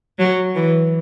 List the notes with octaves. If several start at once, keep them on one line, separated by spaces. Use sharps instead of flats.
F#3
E3